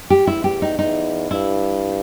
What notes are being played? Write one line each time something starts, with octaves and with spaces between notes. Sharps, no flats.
G4
E2 E4
G4
D#4
E2 D#4
G2 E4